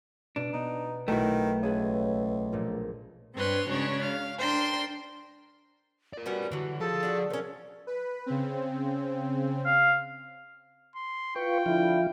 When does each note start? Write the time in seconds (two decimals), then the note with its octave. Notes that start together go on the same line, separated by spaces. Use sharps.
0.36 B2 D4
0.54 B3 D#4
1.08 B1 B2 D#3 A3 E4 F#4
1.63 C#2 G#4 A4 B4
2.52 A#1 A#2
3.35 G2 C4 D4 B4 C#5 C6
3.69 C#3 G#3 C#4 D4 F#4 C#5
4.02 F5
4.39 D4 A#4 C5 G5 C6
6.13 A#4 D5
6.26 G3 B3 C#4 F#4
6.52 D3 E3 F#3 F#4
6.80 F3 G#4 A4
7.03 D4 F#4
7.30 C4 C#4 A#4
7.87 B4
8.26 C#3 C4
9.66 F5
10.96 C6
11.36 F4 B4 G5 C#6
11.66 D3 F3 E4 F4